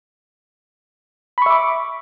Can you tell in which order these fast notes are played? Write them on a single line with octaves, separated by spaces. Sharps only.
B5 C#6 E5 D6